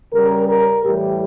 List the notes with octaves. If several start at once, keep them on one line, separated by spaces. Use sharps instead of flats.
C#3 G3 A#4
A#4
A2 E3 G3 G4